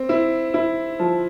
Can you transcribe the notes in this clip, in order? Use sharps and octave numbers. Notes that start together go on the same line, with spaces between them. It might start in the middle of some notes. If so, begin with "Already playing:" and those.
Already playing: C4
E4
E4
F3